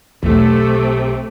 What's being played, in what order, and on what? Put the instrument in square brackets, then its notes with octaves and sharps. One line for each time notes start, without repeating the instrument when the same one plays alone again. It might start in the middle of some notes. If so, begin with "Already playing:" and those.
[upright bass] B1 [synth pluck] E2 [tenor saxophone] C3 [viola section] A3